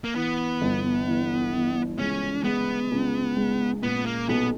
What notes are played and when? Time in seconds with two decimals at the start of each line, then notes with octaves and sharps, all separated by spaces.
0.04 A#3
0.15 E3 B3
0.61 G1
1.07 E3
1.53 E3
1.99 C#2 C#4
2.45 G#3 B3
2.91 C#2
3.37 G#3
3.83 A#2 B3
4.06 A#3
4.29 B1 B3